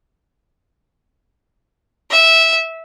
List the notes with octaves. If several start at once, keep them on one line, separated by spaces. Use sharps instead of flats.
E5